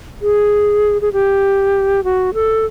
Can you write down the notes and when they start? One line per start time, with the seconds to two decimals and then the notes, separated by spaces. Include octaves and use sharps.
0.22 G#4
1.02 G#4
1.13 G4
2.04 F#4
2.34 A4